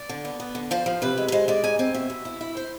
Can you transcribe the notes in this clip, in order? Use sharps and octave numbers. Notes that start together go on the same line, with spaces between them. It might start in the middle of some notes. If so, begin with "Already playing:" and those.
Already playing: D5
D3
B3
B3
D3
F3 C5
F3
C3 B4
G#3
B4
G#3 C5
G#3 D5
G#2 G#5
C4 G#5
B2 E5
B2
E4
E4
C5